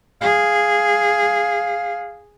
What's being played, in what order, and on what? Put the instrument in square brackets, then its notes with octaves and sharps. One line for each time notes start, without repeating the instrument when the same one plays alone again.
[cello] G#4 [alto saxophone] F5